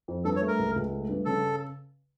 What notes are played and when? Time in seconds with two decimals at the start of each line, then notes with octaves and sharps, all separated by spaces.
0.08 F2
0.25 G2 A4
0.36 C#5
0.42 A3
0.48 A#4
0.59 C#2
0.76 C#2
0.92 A3
1.09 G2
1.25 C#3 A4